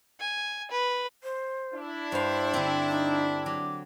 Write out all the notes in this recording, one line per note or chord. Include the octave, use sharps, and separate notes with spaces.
G#5
B4
C5
D4 E4
G2 C5 F5
D3 C4
D#4
F#3 D6